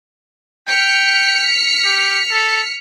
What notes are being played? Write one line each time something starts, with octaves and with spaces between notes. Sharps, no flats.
G5 F6 B6 C#7
G4
A4